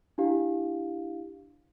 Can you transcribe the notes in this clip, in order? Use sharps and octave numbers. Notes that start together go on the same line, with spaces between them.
D4 E4 G4 F5